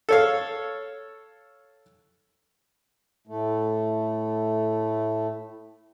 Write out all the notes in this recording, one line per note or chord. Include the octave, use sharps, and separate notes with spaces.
A4 C#5 F5
A2 A3